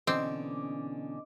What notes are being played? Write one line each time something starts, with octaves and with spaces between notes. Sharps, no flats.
B2 D3 E3 C4 C#4 D#5 D6